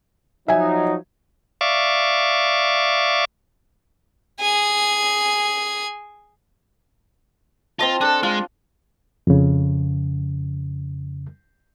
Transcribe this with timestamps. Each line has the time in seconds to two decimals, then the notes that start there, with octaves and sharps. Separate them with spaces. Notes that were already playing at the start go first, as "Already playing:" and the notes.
0.48 F3 F#3 D#4 E5 G#5
1.61 D5 E5 F5 C#6 D6
4.40 G#4 G#5
7.79 C4 F4 D#5 A5
8.01 D4 G#4 A4
8.23 G#3 F4
9.27 F2 C#3